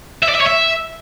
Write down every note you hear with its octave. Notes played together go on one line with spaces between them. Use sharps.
E5
D5
E5
C#5
E5